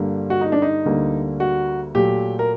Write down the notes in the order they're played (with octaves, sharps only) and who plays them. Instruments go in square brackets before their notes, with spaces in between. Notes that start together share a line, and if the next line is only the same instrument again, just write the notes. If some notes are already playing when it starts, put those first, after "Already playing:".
Already playing: [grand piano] G2 D3 G3 A#3
F#4
D#4
D4
D#4
D2 D3 G3 A#3
F#4
A#2 F#3 A3 G4
A#4